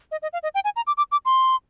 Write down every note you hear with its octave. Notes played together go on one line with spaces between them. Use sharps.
D#5
D#5
F5
D#5
G5
G#5
A#5
D6
D6
D6
C6